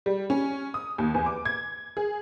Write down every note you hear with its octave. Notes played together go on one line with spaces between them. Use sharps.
G3
C#4
D#6
D#2
E2
D6
G#6
G#4